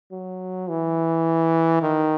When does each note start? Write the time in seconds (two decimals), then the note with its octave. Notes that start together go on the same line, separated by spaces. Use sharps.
0.12 F#3
0.68 E3
1.82 D#3